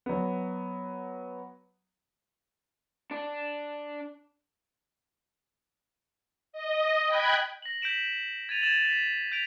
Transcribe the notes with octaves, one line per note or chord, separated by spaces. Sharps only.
F#3 B3
D4
D#5
G5 B5 F#6 G#6
A#6 F#7
G6 B6 D7 E7 F#7
G#6 A6 D#7 F7
G#6 A6 E7 F#7
B6
G6 B6 D7 F7